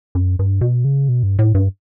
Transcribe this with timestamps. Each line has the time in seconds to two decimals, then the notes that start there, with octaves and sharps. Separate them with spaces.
0.15 F#2
0.39 G2
0.61 B2
0.85 C#3
1.08 B2
1.23 G2
1.39 A2
1.55 G2